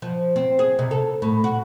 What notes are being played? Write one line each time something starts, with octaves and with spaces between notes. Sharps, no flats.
F3
C4
G#4
C3
A4
A2
F#4